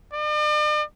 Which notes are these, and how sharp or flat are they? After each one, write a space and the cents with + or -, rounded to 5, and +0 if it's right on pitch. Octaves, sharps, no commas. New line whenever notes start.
D5 +45